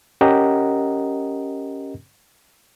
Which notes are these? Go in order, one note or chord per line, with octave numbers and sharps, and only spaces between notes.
C#4 G4 A#4 D#5 F#5 A#5